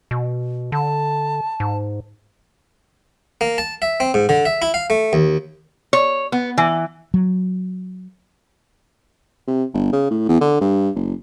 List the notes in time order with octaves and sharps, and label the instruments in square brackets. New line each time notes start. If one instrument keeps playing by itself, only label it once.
[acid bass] B2
[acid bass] D3 [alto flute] A5
[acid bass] G#2
[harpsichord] A#3
A5
E5
C4
G#2
D3
E5
E4
F5
A3
D#2
[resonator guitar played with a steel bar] C#5
B3
E3
[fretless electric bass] F#3
[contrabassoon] C3
G1
C#3
A2
E2
D3
G2
F#1